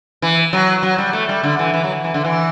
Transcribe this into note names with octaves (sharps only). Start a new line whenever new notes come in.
E3
F#3
F#3
G3
A3
G3
D3
E3
E3
F#3
E3
D3
E3